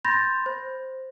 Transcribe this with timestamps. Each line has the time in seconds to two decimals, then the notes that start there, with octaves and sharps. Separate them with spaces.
0.05 B5 C6 G6 A6 A#6
0.46 C5